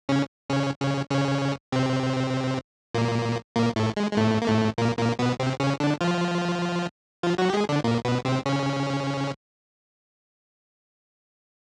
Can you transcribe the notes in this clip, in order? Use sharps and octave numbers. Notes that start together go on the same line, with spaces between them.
C#3 C#4
C#3 C#4
C#3 C#4
C#3 C#4
C3 C4
A#2 A#3
A#2 A#3
A2 A3
G#3
G#3
A2 A3
A#3
A2 A3
A#2 A#3
A#2 A#3
B2 B3
C3 C4
C#3 C#4
D3 D4
F3 F4
F3 F4
F#3 F#4
G4
G#3 G#4
D3 D4
A#2 A#3
B2 B3
C3 C4
C#3 C#4